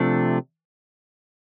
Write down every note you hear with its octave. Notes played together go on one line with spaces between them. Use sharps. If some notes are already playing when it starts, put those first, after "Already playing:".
Already playing: C3 F3 A3 D4